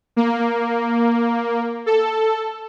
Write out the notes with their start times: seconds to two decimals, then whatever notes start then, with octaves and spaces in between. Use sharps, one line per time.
0.17 A#3
1.86 A4